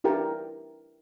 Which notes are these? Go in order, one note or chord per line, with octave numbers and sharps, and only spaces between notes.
D4 E4 G4 A#4 G5